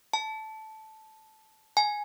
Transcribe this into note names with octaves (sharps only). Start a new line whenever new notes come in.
A5
G#5